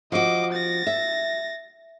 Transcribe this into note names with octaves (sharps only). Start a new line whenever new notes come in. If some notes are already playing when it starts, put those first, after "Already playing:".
F3 F#4 D#5 D6
A6 A#6
E5